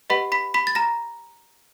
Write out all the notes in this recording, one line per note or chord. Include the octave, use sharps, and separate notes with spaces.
G4 B4 D#5 F#5 B5 B6
B5 B6
B5 B6
A6
A#5 A#6